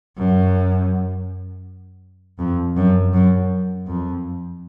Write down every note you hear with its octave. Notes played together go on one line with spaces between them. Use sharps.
F#2
F2
F#2
F#2
F2